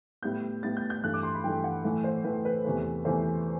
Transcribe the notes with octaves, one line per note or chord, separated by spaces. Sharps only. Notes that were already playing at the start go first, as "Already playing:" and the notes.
A2 G3 B3 G6
A2 G3 B3 A6
G6
G6
G2 E3 A3 F#6
D6
C6
B5
G2 E3 A3 G5
F#5
A2 E3 A3
C5
A2 E3 A3 B4
B4
E2 C3 E3 A3
E2 C3 E3 A3 C5